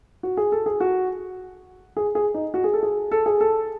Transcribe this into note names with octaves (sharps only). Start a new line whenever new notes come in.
F#4
G#4
A4
G#4
F#4
G#4
G#4
D#4
F#4
G#4
A4
G#4
A4
G#4
A4